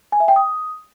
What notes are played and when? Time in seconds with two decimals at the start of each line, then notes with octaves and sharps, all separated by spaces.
0.12 G#5
0.20 E5
0.28 G5
0.36 D#6